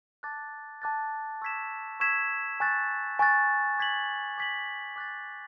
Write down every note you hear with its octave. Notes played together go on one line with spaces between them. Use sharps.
A5 D6 F#6 A6
A5 D6 F#6 A6
C#6 E6 G#6 B6 E7
C#6 E6 G#6 B6 E7
G#5 C#6 F#6 A6
G#5 C#6 F#6 A6
D6 G#6 B6 F#7
D6 G#6 B6 F#7
D6 F#6 A6